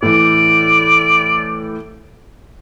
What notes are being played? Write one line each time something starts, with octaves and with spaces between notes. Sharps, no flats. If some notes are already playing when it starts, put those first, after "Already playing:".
A2 E3 D5